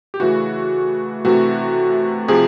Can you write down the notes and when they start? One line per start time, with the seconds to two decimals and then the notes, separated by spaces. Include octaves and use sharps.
0.14 G4
0.20 C#3 E3 A3 F#4
1.25 C3 E3 A3 F#4
2.28 C3 F3 G#4